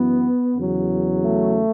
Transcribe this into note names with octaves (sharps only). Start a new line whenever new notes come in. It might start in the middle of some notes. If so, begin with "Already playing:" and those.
Already playing: F#2 E3 B3
E2 C#3 F#3
A3